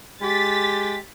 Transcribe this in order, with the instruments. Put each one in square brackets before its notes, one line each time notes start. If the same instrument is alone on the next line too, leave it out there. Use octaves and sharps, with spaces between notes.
[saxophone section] G#3 G4 [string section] A6 B6